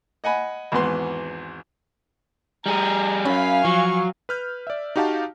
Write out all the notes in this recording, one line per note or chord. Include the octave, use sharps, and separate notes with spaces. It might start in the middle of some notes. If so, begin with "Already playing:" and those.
D#5 F#5 G#5 B5
G#1 E2 B3 B4 C6
G3 G#4 A#5
F#2 C#4 F5 G#5 B5
F3 F#3 C#6
B4 F6 G6
D5 E5
D#4 F#4 G4 F5 A5